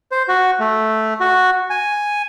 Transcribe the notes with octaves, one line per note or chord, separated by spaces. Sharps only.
C5
F#4
A3
F#4
G#5